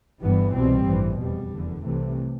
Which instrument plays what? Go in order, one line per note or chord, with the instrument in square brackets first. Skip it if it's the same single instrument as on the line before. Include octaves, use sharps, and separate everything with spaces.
[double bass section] G1 G2 E3 G3 B3
C2 B2 G3 C4
A1 G2 E3
F1 E2 B2 G3
F1 E2 D3
C2 C3 E3 A3